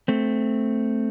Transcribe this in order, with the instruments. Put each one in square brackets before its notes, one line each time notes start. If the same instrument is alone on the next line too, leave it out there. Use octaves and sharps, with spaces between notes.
[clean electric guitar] A3 C4